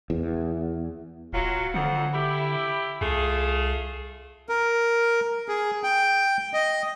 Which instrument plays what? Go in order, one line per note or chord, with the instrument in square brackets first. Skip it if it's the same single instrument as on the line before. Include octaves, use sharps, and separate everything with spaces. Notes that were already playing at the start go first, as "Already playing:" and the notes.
[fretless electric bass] E2
[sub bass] D1 [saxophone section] F#3 F4
[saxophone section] F2 F#5 [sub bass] D3
[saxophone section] E4 G4
[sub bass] C2 [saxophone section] A3 F4 G#4
[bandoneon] A#4
G#4
G5
D#5